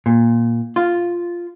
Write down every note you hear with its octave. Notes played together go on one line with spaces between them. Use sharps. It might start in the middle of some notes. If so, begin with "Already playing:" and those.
A#2
F4